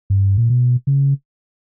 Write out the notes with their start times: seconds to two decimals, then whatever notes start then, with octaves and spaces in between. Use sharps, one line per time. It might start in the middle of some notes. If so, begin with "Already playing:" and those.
0.10 G2
0.37 A#2
0.50 B2
0.87 C#3